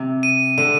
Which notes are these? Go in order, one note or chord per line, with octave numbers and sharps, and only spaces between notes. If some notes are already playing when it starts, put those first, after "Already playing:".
Already playing: C3
D#7
D3 D#7